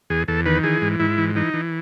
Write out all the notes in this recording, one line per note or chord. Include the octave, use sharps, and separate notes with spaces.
E2 G#4
E2 A4
D#3 B4
E3 G#4
G#2
G#2 E4
E3
E3 D#4
E3